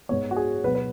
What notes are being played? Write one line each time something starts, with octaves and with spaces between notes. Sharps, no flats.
G#2 G#3 B3 C#5
F#4
G#4
B2 F#3 B3 B4
B4